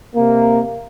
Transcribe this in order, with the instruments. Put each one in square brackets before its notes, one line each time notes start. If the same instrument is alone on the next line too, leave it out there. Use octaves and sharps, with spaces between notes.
[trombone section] C3 A#3